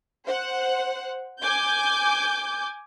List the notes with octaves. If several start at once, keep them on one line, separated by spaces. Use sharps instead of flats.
C5 F#5
G#5 D6 G6